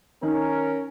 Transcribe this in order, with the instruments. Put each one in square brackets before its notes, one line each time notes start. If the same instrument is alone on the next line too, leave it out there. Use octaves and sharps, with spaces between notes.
[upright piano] D#3 [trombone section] C#4 A#4